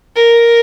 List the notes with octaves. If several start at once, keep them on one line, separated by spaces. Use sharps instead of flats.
A#4